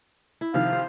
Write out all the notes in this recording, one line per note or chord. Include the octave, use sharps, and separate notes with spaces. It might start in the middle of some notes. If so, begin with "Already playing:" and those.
E4
C3 D#3 F3 F5
C5